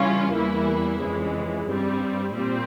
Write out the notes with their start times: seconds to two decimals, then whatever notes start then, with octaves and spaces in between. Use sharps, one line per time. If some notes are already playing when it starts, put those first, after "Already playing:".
Already playing: C#3 E3 G3 C#4 F4
0.33 E2 E3 G3 A#3 E4
1.00 F2 C#3 E3 G#3
1.66 G2 G3 C4
2.33 A#2 G3 C4